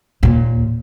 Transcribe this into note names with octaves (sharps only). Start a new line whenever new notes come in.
D#2 A#2